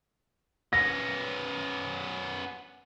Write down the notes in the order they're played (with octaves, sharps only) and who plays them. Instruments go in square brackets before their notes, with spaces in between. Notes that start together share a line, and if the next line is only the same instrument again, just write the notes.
[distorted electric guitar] B3 C#4 [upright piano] A#6